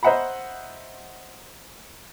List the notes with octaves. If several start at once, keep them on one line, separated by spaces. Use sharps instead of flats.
C5 D#5 E5 F#5 A#5 B5